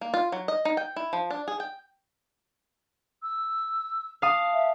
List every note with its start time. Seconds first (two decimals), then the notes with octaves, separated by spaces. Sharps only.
0.01 A#3
0.14 F4
0.32 F#3
0.48 D#5
0.65 D#4
0.77 G5
0.96 E4
1.13 F3
1.30 D4
1.48 G#4
1.60 G5
3.23 E6
4.22 F5 A5 D#6
4.54 E5